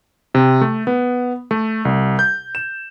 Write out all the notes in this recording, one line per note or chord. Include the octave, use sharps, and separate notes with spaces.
C3
A3
B3
A3
C2
G6
E7